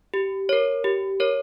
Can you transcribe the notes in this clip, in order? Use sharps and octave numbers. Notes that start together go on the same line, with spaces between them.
G4
A#4 C#5
G4
A#4 C#5